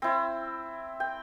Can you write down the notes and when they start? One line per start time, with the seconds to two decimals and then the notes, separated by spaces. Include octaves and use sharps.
0.02 C4 E4
1.00 G5